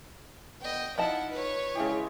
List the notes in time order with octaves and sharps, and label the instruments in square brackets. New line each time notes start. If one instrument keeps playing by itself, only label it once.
[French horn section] A#2 D3 B3 [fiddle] D#5 G5
[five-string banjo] F3 D#5 A5 [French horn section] D#4 [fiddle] E4 F#5
[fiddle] B4 C#5
[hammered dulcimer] C#3 G#3 G4 [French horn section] E4